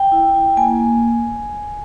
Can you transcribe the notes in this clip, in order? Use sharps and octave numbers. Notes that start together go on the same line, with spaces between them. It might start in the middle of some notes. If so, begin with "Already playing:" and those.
Already playing: G5
E4
E4
A#3 G#5
A#3